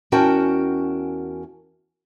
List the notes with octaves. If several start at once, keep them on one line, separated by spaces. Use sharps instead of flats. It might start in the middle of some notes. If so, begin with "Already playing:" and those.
E2 C#4 F#4 A#4 G5 A5